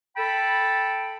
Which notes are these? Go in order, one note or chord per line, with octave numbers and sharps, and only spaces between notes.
A4 G5 A5 B5